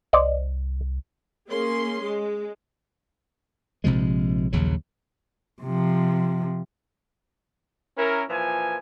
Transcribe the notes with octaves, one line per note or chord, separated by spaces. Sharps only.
C2 C5 D5 D#5
A#3 C#4 G#4 C6
G#3
A#1 C3 F3 G#3
A#1 D#2 C#3 F#3
C3 F3
C#4 E4 A#4
A#2 E3 F3 G#5